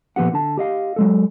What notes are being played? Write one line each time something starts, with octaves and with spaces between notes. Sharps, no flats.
A#2 F3 B3 G4 F#5
D3 A5
G4 D#5 F5
F#3 G#3 A4